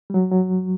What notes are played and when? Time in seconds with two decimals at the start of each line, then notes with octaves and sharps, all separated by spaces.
0.10 G3
0.14 F#3
0.31 F#3